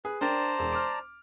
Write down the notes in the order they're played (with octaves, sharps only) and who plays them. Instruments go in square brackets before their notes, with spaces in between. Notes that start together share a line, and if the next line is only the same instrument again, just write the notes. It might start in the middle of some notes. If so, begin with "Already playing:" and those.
[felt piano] G#4 [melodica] B4
[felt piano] D4 A#4 G5 [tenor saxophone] C5 [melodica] D5 A5 A#5
[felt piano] E1
D6 F6